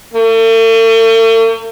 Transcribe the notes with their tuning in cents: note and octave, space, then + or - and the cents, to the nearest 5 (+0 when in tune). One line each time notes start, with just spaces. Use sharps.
A3 +45